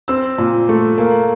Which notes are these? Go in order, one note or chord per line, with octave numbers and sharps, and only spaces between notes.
C4 E6
A#2
A3
A#3